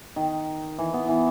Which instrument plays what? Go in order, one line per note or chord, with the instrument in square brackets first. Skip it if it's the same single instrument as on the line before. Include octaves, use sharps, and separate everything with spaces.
[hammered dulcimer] D#3
E3
B3
E3